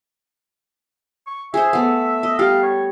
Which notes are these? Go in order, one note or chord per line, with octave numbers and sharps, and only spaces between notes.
C#6
G#4 C5 E5
A3 B3
D#5
G3 G4 F5
C#5